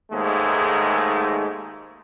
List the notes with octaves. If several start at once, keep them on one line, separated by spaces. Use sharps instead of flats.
D#2 G#2 G#3 A3